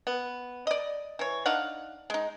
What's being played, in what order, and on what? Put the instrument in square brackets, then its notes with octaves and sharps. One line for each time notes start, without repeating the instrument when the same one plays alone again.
[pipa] B3
D5 D#5
E3 C#5
D4 D#4 F5 F#5
G#3 D#4